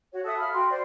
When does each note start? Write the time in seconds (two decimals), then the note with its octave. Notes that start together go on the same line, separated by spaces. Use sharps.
0.12 F#4 C#5
0.25 A4 E5 F#5 D#6
0.38 F5 B5 F6
0.53 F#4 G5 C6
0.70 C5 D5